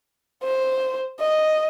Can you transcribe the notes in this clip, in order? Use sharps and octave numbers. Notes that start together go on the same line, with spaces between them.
C5
D#5